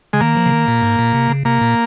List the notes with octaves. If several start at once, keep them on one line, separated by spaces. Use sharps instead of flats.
C#3 G#3
D#3 A#3
F3
C#3
D#3
A#2
G#2
A#2
C3
C#3
C3 A#3
A#2